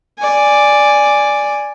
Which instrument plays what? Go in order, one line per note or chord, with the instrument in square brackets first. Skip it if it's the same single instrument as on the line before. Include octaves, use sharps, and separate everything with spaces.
[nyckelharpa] D5 G#5